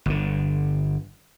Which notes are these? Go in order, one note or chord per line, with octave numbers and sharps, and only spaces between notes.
G1 D3